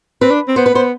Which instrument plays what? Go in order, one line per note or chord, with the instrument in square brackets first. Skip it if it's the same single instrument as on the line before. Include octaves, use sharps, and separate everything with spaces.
[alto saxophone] C4 [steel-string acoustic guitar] B4
[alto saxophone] D4
C4
[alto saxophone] B3 [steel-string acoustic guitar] C5
[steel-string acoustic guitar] B4
[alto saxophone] B3 [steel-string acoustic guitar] C5